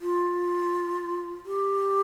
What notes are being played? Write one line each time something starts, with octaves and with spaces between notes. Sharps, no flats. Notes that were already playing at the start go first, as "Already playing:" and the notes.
F4
G4